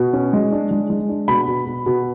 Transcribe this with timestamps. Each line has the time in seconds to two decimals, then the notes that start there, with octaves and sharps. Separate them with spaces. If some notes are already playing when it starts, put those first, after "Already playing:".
Already playing: B2
0.13 C#4
0.33 G#3
0.52 D4
0.71 G#3
0.90 G#3
1.09 D4
1.28 B2 B5
1.48 B2
1.66 B2
1.86 B2